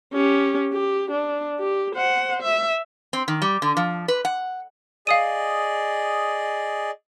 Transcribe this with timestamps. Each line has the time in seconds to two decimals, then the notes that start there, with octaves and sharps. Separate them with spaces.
0.13 C#4 G4
0.73 G4
1.11 D4
1.60 G4
1.95 C5 F#5
2.42 E5
3.13 C4
3.28 D#3
3.42 G3
3.62 D3
3.77 F3
4.08 B4
4.25 F#5
5.07 G#4 D5 D#5 F5 D#6 D#7